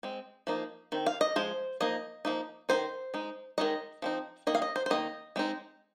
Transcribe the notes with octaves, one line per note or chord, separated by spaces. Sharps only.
G#3 C4
F3 A#3 D#4
D#3 C4
F5
D#5
F3 G#3 C5
F3 A#3 D#4 D#5
F3 A#3 D#4
D#3 C4 D#4 C5
G#3 D#4
D#3 G#3 D#4 D#5
F3 C4 D#4
D#3 A#3 D#4 D#5
F5
D#5
C5
C5
D#3 A#3 D#4 D#5
G#3 C4 D#4